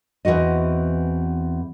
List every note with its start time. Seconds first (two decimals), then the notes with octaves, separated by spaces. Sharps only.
0.25 E2 E3 C4 F#4 D#5